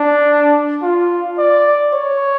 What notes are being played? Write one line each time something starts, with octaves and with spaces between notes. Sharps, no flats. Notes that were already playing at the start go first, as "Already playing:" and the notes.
Already playing: D4
F4
D5
C#5